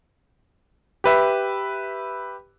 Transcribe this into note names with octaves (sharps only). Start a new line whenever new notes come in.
G4 B4 E5